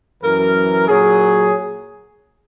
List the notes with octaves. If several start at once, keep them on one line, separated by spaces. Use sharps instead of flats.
F#2 E3 A#4
A#2 F#3 G#4